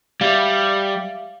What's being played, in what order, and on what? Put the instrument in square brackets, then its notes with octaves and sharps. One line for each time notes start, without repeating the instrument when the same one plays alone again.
[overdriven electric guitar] G3 [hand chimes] E5 F5